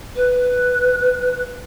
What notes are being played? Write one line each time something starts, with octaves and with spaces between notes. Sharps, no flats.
B4